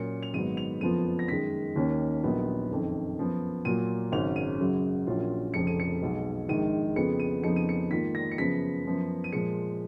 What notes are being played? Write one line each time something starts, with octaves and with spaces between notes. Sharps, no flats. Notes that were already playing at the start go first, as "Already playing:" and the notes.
Already playing: A#2 F#3 C#4 C#7
F7
G#1 G#2 F#3 B3 D#7
F7
F#1 F2 F3 B3 F4 D#7
A#6
F#2 D#3 G#3 B6
D#2 D#3 A#3 C#4
A#1 A#2 F#3 B3 D#4
F#1 F2 D#3
F#2 F3 B3
A#2 F#3 A#3 F4 D#7
G#1 F#2 C#3 F#3 C#4 F7
D#7
F#2 C#3 F#3
A#1 A#2 F#3 C#4 F4
F1 F2 C#3 F3 C#7
D#7
C#7
B1 B2 G#3
A#1 G#2 D#3 G#3 D#7
F2 C#3 G#3 B3 F4 C#7
D#7
F2 C#3 F3 B3 D#4 C#7
D#7
C#7
G#2 D#3 A#3 F4 B6
A#6
C#7
F#2 C#3 F3 B3 F4 B6
F#2 F3 B3
D#7
A#2 F3 G#3 C#7